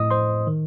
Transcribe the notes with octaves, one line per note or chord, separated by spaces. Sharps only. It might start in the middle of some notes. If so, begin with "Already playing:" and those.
Already playing: A2 D#5 D#6
C5 C6
D#3